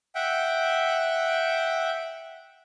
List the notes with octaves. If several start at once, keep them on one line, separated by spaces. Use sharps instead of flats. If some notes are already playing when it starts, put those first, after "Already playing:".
E5 F#5 G5